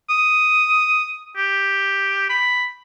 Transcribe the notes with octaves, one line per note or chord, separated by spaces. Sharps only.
D#6
G4
B5